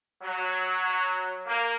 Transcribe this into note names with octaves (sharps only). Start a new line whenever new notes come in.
F#3
A#3